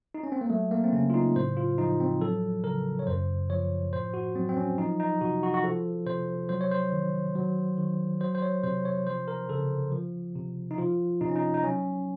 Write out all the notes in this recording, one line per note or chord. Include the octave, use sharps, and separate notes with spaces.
D#4
C#4
C4
A#3
F#3 A3
A#3
C4
C#3 C#4
F4
D#4
A2 C5
F4
F3 D#4
C4
F#3 A4
C#3 A#4
C#5
F#2 C5
F3 C#5
A2 C5
F#4
F#3 C4
C4
C#4
F3 D#4
D#4
C3 F#4
F#4
F#4
F3 A4
C3 C5
F#3 C5
C#5
C5
D#3
F#3
D#3
F#3 C5
C5
C#5
C3 C5
C#5
F3 C5
A#4
C#3 A4
F3
C3
D#4
F3 F4
C3 D#4
C#4
D#4
D#4
F#3 C#4